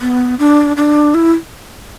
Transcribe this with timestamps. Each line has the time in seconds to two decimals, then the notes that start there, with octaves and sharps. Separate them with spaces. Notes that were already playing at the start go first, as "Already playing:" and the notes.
0.01 B3
0.39 D4
0.77 D4
1.14 E4